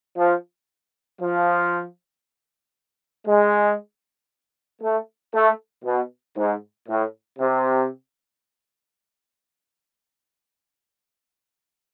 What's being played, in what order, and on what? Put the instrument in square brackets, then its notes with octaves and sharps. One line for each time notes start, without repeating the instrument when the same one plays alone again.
[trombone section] F3
F3
G#3
A3
A3
B2
G#2
A2
C3